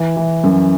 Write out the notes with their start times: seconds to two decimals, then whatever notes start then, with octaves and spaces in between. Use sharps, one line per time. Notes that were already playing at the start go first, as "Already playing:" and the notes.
Already playing: E3
0.17 E3
0.44 F#2